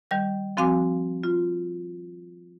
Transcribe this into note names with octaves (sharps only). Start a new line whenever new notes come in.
D#3 G3 G6
F3 C4 F#4 F5 G#5 D6
F4